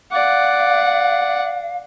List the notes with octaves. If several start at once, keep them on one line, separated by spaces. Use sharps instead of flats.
D5 F5 F#5